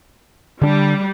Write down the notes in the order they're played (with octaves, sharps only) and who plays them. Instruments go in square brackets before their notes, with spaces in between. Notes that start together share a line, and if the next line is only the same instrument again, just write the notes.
[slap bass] D3 D4 [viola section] G3